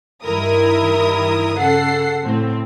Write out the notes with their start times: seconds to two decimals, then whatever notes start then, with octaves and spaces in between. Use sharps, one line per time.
0.24 G2 D#3 E4 A#4 D#6
1.59 C#3 A4 F#5 C7
2.24 A2 C4